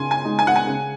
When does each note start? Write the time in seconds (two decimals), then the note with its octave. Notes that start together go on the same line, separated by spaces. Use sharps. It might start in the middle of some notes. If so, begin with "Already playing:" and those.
Already playing: C#3 G#5 C6
0.11 G#5
0.25 G#3 D#4
0.39 G#5
0.47 F#5
0.56 G#5
0.68 C#3